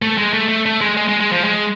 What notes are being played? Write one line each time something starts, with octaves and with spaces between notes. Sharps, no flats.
A3
G#3
A3
A3
A3
G#3
G#3
G#3
G#3
F3
G#3